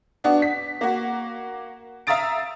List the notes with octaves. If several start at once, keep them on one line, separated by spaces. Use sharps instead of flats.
B3 D4 F#4
B6
A#3 F#4
E5 F5 A#5 D#6 A6 D7